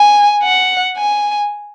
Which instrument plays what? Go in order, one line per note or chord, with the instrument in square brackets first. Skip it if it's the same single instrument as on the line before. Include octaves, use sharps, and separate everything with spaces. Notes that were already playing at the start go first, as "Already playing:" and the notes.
Already playing: [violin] G#5
F#5
G#5